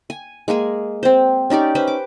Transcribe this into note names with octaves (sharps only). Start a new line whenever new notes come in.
G#5
G#3 A#3 G#4 G#5
C4 C5
C#4 D#4 G4 D5
C#4 B4 C5
D6